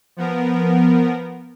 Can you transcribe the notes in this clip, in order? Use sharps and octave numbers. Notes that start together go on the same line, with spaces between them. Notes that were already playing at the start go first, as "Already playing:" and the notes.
F3 B3 A#4